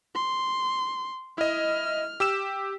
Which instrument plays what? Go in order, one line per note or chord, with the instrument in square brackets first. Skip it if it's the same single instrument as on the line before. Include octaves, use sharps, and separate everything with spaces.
[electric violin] C6
[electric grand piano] E4 D#5 [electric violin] F6
[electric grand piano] G4 E6 E7